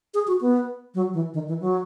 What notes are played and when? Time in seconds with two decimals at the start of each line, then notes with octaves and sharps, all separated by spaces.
0.14 G#4
0.27 F#4
0.41 B3
0.95 F#3
1.14 E3
1.34 D#3
1.48 E3
1.61 F#3